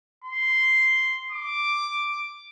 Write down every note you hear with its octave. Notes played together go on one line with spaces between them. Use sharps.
C6
D6